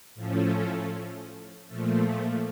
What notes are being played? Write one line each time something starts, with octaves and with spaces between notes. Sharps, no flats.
A2 F3 A3 C#4
A#2 F3 A3